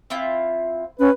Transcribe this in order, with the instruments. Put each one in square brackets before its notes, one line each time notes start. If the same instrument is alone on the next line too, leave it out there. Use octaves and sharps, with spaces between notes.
[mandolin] C4 E4 F4
[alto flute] C#4 [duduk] B4